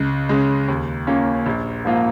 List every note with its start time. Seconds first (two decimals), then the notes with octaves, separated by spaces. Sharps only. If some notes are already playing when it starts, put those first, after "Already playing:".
Already playing: C#2
0.29 C#3 G#3
0.68 D#2
1.07 C#3 A#3 C#4 F4
1.46 A#1
1.85 G#2 F3 A#3 F4